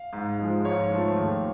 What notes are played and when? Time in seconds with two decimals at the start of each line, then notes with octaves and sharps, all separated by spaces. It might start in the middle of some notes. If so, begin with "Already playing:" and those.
Already playing: F5
0.13 G#2
0.39 F3 G#3
0.65 G#2 C#5
0.91 F3 A3
1.16 D#2